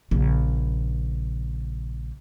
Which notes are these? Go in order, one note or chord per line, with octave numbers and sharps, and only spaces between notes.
A#1 C#3